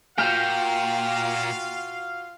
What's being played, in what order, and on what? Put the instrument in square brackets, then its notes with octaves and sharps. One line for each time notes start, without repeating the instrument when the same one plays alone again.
[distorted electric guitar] A#2 [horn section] F4 F#4 F5 [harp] G5 F6